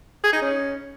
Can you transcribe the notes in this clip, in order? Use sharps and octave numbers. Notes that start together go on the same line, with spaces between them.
G#4
D#4
C#4